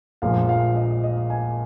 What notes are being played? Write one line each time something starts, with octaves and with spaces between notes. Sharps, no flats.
A#1 A#2 F3 G#3 F5
F5
D#5
D#5
G#5